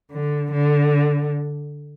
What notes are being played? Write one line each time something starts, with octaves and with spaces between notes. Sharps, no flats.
D3
D3